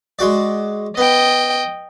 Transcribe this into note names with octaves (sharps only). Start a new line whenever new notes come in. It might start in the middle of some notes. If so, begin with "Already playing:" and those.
G#3 F#4 D5
B3 D#5 G5